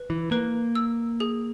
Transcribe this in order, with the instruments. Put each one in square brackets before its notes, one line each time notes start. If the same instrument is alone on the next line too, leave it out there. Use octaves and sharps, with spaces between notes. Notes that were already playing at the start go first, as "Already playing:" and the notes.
Already playing: [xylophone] B4
[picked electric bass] E3
[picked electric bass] A#3 [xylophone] B4
[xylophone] E6
G#4